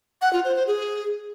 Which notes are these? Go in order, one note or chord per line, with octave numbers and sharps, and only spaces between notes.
F#5
F4
C5
C5
G#4